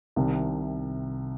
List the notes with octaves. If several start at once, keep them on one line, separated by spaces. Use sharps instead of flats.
C2 C3 D#3